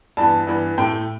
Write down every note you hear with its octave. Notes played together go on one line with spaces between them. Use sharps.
G2 E3 B3 A5
G2 E3 B3
A2 A3 G5